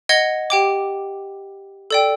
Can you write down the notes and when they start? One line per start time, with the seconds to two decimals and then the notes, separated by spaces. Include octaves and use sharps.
0.09 D#5 F#5 G#6 G7
0.50 G4 G5 D6
1.91 A4 D5 G5